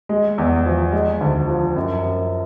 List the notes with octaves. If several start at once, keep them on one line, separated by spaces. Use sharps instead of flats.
G#3
E2
F3
G#3
D2
F3
F#2
F#2